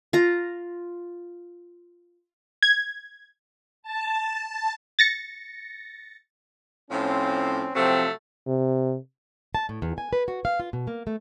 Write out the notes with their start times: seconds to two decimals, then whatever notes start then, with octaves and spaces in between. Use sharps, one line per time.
0.13 F4 A#5
2.63 G#6
3.83 A5
4.45 A5
4.99 A6 A#6 C#7
6.91 A2 F3 C4 C#4
7.75 C3 F3 F#3 A3 C4
8.47 C3
9.55 A5
9.69 A2
9.82 E2
9.98 G#5
10.13 B4
10.28 F#4
10.45 F5
10.60 F4
10.73 B2
10.87 A#3
11.07 A3